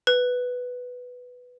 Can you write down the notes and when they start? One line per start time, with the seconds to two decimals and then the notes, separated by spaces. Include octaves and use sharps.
0.07 B4